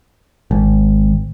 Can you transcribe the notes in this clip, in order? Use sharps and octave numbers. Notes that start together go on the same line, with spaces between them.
G#1